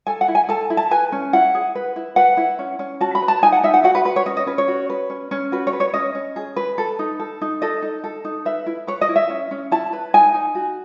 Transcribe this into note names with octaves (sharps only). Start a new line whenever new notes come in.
A4 G#5
F#5
E4
G#5
A4 A5
E4
A5
B4 G#5
C#4
E4 F#5
G#4
B4
E4
B4 F#5
E4
C#4
C#4
F#4 A5
B5
B4
A5
D#4 G#5
F#5
D#4 E5
F#5
F#4 F#5
B4
B4
C#5
C#4 D#5
D#5
C#4 B4
C#5
F#4
B4
C#4
C#4
F#4 B4
C#5
B4
C#5
C#4 D#5
C#4
G#4
B4
A4
D#4
A4
D#4
A4 D#5
D#4
A4
D#4
B4 E5
E4
B4 C#5
D#5
E4
E5
C#4
C#4
E4 A5
B4
D#4 G#5
D#4
F#4